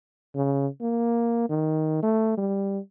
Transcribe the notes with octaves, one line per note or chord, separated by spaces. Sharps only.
C#3
A#3
D#3
A3
G3